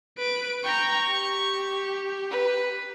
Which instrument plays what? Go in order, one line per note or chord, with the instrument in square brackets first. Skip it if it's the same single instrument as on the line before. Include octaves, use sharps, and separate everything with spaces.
[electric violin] B4 D7
[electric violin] G5 A#5 [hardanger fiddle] C#6
[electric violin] G4
[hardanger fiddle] B4